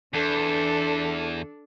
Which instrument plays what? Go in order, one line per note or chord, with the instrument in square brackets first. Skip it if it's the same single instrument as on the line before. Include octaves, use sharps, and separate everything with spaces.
[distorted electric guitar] E2 [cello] D4 [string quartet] A4